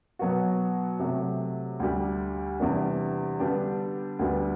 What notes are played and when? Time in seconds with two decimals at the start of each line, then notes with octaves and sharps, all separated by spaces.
0.19 B2 F#3 B3 F#4
1.00 C3 F#3 A3
1.80 D2 D3 G3
2.59 E2 C3 G3 B3 D4
3.39 D3 G3 B3 D4 G4
4.19 D2 D3 G3 B3